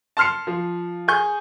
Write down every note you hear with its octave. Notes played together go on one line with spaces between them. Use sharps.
A5 C6 F6 C7 C#7
F3
G#4 G#5 C#6 G6